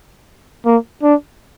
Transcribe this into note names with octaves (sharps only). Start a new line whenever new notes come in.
A#3
D4